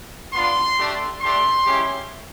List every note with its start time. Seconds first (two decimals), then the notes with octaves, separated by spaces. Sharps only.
0.34 B3 D4 F4 C6
0.78 A3 D4 G4
1.22 A3 D4 G4 C6
1.66 G#3 C#4 E4 G4